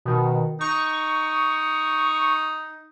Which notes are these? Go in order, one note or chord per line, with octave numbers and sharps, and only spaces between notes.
B2 D#3
D#4 C#6